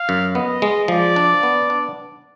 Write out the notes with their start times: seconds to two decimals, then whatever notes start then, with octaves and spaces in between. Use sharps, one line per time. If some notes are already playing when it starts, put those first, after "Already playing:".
Already playing: F5
0.09 F#2
0.35 B3 D#5
0.62 G#3
0.88 F3 D5
1.16 D4
1.43 B3
1.70 D4